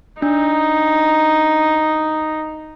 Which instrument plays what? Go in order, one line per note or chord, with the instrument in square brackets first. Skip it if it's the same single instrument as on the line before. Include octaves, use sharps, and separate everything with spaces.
[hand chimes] D4 [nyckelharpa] D#4